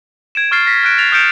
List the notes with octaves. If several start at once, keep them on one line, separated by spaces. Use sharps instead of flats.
G#6 D7 E7
C#6 F6 A6 C7
A#6 B6
F6 F#6 D7
A6 F7
D#6 F6 G6 C#7 D7 E7